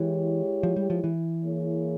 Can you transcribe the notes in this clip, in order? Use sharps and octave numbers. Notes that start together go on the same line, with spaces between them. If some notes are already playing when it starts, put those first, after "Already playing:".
Already playing: E3 G#3 E4 G4 C#5
F3
G3
F3
E3
A#3 E4 G#4 C#5